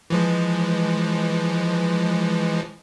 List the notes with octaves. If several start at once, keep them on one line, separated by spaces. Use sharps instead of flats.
E3 F3 G#3